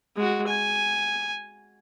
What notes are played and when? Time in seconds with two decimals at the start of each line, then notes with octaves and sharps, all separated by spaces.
0.16 G#3 F#4
0.47 G#5